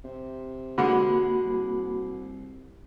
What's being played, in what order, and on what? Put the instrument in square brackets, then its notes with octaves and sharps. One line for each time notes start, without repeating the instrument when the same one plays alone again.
[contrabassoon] C3
[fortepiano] D3 G#3 F#5 [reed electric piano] A#3 F#4 B5
[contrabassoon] C2